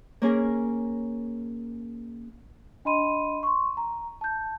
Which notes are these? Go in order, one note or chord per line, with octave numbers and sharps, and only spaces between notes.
A#3 C#4 G#4 A#4
D4 D#5 B5 C6 D#7
C6 C#6
A#5
A5 G6